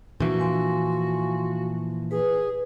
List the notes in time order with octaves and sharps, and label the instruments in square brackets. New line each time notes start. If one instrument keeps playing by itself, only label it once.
[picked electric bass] A#2 E3 F3 [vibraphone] D4 [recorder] F#4
[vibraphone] F5 G#5 C6
[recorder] G#4 [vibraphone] B4